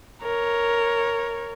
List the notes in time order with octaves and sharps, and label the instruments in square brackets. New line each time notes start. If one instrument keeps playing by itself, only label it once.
[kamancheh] A#4 C#5